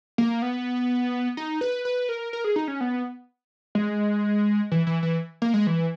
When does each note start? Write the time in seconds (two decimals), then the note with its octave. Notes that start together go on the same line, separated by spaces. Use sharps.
0.18 A#3
0.42 B3
1.37 D#4
1.61 B4
1.85 B4
2.09 A#4
2.33 A#4
2.44 G#4
2.56 D#4
2.68 C#4
2.81 B3
3.75 G#3
4.71 E3
4.87 E3
5.03 E3
5.42 A#3
5.54 G#3
5.67 E3